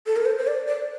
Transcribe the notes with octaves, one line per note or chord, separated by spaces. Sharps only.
A4
A#4
C5
C5
D5
D5